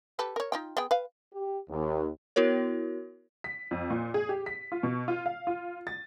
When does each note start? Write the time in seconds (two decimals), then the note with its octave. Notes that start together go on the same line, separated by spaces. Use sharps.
0.19 G4 A4 B4
0.36 A#4 C#5
0.52 D#4 F4 G5
0.77 B3 G#4 G5
0.91 B4 F5
1.33 G4
1.70 D#2
2.36 B3 E4 F#4 A#4 C#5
3.44 B6
3.71 F2
3.90 A#2
4.14 G#4
4.29 G4
4.46 B6
4.72 F4
4.83 B2
5.08 F4
5.26 F5
5.47 F4
5.87 A6